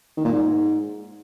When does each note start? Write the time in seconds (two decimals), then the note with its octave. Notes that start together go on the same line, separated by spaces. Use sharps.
0.17 D#3
0.25 A#2
0.32 G#2